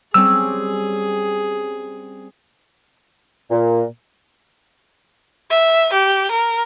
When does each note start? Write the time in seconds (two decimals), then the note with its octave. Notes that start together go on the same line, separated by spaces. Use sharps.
0.14 G3 C4 C#4 G#4 E6
3.51 A#2
5.50 E5
5.93 G4
6.31 A#4